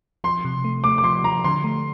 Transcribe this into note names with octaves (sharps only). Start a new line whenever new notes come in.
F3 C6
C3
A3
A3 D6
D6
F3 C6
F3 A#5
D3 C6
A3